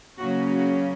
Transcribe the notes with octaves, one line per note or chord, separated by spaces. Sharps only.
C#3 F#3 A#3 C#4 F#4
F#4